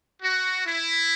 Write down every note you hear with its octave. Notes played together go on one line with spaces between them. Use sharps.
F#4
E4